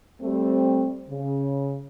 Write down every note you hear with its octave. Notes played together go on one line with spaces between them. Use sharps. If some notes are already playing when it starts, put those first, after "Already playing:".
G3 A3 C4
C#3